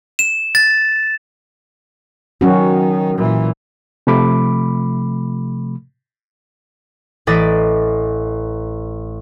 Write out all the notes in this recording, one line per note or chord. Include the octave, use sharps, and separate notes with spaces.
E7
A6
D#3 F#3 C#4 F#4
A#2 E3
C3 F3 A3 B5 D6
A1 D5 D#5 D6 A6 B6